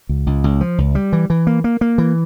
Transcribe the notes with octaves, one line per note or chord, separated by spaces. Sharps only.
C#2
C#2
C#2
F3
C#2
G3
E3
E3
A#3
A#3
A#3
E3